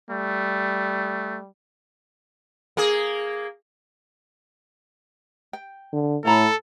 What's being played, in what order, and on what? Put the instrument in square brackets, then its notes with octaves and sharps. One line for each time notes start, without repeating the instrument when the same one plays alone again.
[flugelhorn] G3 [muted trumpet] A3
[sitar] A#3 G#4
[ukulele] G5
[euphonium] D3
[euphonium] A2 [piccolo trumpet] A4 [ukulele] C#5 A#5 B5